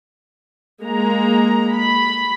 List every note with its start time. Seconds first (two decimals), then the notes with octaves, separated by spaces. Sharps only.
0.81 G#3 A#3 A#5
1.73 B5